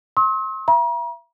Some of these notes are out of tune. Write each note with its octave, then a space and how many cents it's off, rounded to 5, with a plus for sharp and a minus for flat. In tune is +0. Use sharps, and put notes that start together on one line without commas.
C6 +35 E6 -45
E5 +35 A#5 +40